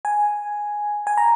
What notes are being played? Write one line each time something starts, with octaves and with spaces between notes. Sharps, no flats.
G#5
G#5
A#5